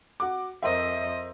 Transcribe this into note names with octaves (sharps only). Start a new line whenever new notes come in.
F#4 D6
F2 A#4 C5 D#5 E5